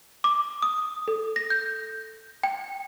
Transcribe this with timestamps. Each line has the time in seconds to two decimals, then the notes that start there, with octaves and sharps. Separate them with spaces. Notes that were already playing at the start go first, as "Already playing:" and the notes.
0.24 D6
0.62 D#6
1.08 A4
1.36 A#6
1.50 G6
2.43 G5